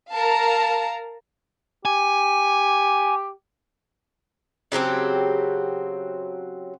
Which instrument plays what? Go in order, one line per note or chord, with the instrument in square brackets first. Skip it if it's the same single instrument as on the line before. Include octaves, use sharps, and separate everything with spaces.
[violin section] A#4 F5 A5 A#5
[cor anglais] G4 [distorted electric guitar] G#5
[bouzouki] C#3 F#3 C4 G4